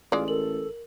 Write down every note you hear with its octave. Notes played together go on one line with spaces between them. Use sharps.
A1 G#3 F4 D5
A4 A#4 F#7